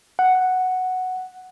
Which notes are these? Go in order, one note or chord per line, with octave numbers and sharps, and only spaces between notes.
F#5